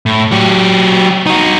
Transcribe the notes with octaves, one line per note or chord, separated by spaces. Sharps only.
A2
F#3 G4
D#4 F#4